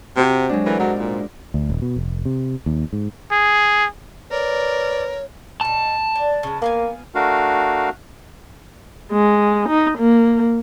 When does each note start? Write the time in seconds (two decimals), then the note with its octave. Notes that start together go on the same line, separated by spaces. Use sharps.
0.17 C3 C4 F#4 G4
0.49 F#3 G#3 D4
0.66 E3 E4 A4 A#4
0.80 G#2 F#3
0.99 A#2
1.54 D2
1.70 D#1
1.82 B2
1.96 F1
2.25 C3
2.66 D#2
2.93 G#2
3.32 G#4
4.31 A#4 B4 C#5 D5
5.61 B2 D#4 A5
6.15 D4
6.43 C#3 G#3
6.62 A#3 B3 F5 G#5
7.15 A3 D4 F#4 A#4 F5
9.12 G#3
9.69 D#4
9.98 A#3